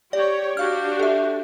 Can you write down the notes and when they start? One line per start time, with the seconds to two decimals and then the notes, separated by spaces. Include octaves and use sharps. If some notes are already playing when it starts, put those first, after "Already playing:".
0.13 G4 C#5 D5
0.57 D4 F#4 G4 F5 F6
0.99 A4 E5